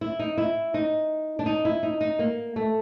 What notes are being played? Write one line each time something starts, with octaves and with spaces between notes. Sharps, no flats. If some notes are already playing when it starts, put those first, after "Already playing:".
E4
D#4
E4
D#4
D4
D#4
E4
D#4
D#4
A#3
A3